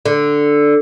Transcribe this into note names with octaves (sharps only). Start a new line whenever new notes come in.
D3